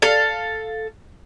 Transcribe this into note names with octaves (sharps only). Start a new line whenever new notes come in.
A4 F5